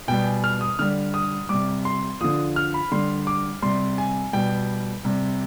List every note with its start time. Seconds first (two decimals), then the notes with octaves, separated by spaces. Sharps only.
0.08 B2 G3 G5
0.25 G#5
0.44 F6
0.61 D#6
0.79 D3 G3 F6
1.14 D#6
1.49 C3 G3 D6
1.85 C6
2.21 D3 F3 D#6
2.56 F6
2.74 B5
2.92 D3 G3 C6
3.27 D6
3.62 C3 G3 C6
3.98 G#5
4.33 B2 G3 G5
5.05 C3 G3